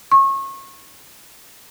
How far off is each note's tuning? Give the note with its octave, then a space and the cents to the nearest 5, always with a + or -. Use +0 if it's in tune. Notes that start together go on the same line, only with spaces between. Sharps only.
C#6 -30